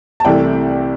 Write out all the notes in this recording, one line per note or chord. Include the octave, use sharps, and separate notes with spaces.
A5
C2 C3 E3 A3 D5 G5